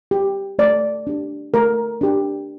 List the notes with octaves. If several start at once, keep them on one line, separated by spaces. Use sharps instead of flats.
G4
A3 D5
D4 G4
A3 A#4
D4 G4